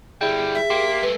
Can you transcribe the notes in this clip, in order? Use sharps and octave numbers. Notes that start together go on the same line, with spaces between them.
D3 G3 E4 G#4 G5
E5
A#3 G4 C6
G#3 A3 B4